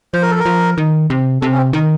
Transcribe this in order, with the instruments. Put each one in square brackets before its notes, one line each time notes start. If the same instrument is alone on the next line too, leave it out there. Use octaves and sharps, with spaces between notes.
[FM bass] F3 [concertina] C5
[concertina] A#4
A4
A#4
[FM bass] F3
D#3
C3
[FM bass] C3 [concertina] A4
[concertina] C#4
C4
[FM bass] D#3 [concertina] A#4